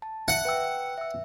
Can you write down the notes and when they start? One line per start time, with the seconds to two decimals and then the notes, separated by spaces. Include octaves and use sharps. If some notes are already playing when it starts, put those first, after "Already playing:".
0.02 A5
0.28 E5 F#5
0.45 B4 G5 E6
0.98 E5 E6